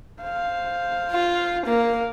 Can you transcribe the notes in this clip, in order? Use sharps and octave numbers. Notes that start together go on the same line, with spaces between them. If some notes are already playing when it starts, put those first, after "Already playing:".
C5 F5
F4
A#3 F5